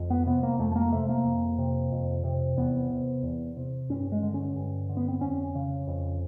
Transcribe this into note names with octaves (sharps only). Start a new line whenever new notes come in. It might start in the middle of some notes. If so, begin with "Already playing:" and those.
Already playing: F2
B3
C3 B3
A#3
F2 A3
A3
A#3
C3 A3
A#3
F2
C3
F2
C3
E2 B3
C3
E2
C3
G2 C#4
G#3
D3
C#4
G2
D3
B3
C4
F2 C#4
C#3
F2